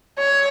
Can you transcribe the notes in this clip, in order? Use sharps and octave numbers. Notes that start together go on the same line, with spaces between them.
C#5